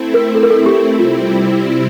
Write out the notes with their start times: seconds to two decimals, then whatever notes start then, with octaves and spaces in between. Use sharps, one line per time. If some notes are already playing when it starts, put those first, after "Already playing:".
Already playing: A3 C4 E4
0.14 A#4
0.35 A4
0.43 A#4
0.50 A4
0.66 G4
0.98 C3 G3 C4 E4 F4